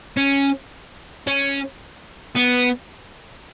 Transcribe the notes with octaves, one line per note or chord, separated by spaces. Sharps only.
C#4
C#4
B3